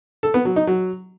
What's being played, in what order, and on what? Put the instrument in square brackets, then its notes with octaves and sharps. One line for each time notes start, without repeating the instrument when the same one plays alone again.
[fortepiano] A4
B3
F#3
D#4
F#3